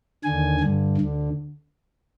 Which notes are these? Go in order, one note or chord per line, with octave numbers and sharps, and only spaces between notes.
D#2 D3 G#5
G2 D3
D2 D3